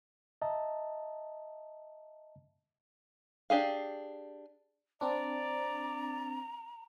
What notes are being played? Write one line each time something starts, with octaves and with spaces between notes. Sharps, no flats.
D#5 E5 A5 A#5
D4 G4 G#4 F5
C4 D4 D5 A#5